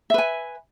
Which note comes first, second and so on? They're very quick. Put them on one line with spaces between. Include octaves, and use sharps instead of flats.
E5 B4 G#5